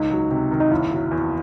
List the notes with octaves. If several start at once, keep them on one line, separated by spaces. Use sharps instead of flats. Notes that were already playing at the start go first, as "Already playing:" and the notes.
Already playing: C#2 D#4
F#3
C3
D#3
D#4
F#1 E4
F#3
E2